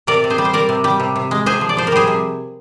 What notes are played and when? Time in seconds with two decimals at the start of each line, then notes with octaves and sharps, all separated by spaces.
0.07 C3 A#4 D5
0.24 C3
0.30 G#4 C5
0.38 G3
0.45 C5
0.53 G3 A#4 D5
0.69 C3
0.84 G3
1.00 C3
1.16 C3
1.31 G#3
1.46 C3 G#4 C5
1.61 F3
1.69 D5
1.77 F3 C5
1.87 A#4
1.92 G3 G#4 C5
2.07 C3